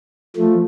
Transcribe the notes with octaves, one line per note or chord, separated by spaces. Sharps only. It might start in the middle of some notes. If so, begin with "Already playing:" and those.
F3 A3